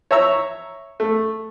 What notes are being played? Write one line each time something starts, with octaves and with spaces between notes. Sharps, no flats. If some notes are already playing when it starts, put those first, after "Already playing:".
C#5 E5 A#5 E6
A3